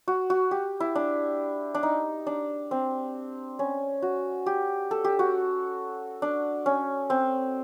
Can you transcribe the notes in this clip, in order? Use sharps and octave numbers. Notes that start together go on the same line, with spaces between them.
F#4
F#4
G4
E4
D4
D4
D#4
D4
C4
C#4
F#4
G4
A4
G4
F#4
D4
C#4
C4